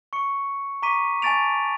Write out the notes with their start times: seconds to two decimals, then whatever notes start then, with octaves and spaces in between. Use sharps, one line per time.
0.13 C#6 C#7
0.82 A#5 C#6 D6 B6 D#7
1.22 G#5 A5 C#6 A6 D7 F7